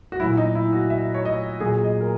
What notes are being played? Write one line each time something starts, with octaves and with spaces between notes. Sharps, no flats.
F#4
A#2 F#3 E4
D#4
E4
F#4
E5
C#5
D#5
A#2 F#3 G#4
D#5
A#4